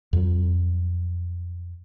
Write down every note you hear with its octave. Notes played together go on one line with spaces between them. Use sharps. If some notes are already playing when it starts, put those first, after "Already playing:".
F2 F#3